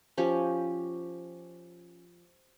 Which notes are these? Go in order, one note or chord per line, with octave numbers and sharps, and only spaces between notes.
F3 C#4 G4